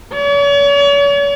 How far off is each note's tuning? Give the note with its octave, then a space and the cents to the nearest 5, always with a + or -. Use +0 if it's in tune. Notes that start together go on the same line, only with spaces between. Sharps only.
C#5 +40